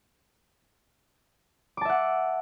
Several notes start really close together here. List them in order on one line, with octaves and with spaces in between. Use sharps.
D6 A5 E5 F#5